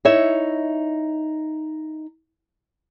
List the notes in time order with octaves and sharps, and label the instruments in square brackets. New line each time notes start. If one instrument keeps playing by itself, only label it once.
[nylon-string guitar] D#4 E4 C#5 E5